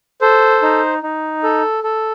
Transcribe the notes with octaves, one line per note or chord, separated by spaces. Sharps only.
A4 C5
D#4
D#4
A4
A4